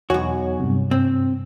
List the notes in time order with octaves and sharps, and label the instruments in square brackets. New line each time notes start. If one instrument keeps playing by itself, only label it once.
[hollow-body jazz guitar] B1 F#4 [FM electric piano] E2 C#5 G#5
[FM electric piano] G2 C3
[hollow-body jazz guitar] C4